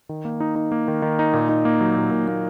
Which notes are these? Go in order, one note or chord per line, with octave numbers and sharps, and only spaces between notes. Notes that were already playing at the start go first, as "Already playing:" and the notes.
D#3
A#3
D#4
D#4
A#3
D#3
D#3
D#4
A#2
D#4
A#3
F#3
A#2
A#2
A#3